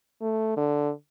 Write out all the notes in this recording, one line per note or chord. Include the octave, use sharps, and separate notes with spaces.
A3
D3